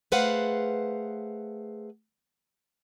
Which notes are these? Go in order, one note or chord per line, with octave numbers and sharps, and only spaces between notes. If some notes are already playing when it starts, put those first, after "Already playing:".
A3 G#4 B4 C5 F5 F#5